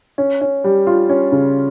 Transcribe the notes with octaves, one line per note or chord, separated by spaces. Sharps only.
C#4
C#4
G3
F4
C#4
C#3